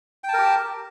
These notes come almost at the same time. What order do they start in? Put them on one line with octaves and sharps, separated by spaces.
G5 A5 A#4 G4